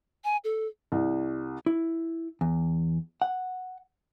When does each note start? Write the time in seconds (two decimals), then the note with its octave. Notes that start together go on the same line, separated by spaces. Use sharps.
0.24 G#5
0.44 A4
0.92 C2
1.66 E4
2.41 E2
3.22 F#5